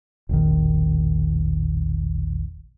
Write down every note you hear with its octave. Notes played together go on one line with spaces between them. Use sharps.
E1 A#1 D#3